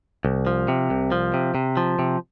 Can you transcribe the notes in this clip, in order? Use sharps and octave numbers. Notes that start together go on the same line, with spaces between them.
C2
F3
C3
C2
F3
C3
C3
F3
C3